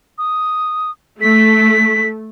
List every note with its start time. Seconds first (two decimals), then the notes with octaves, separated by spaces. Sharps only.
0.18 D#6
1.21 A3 B6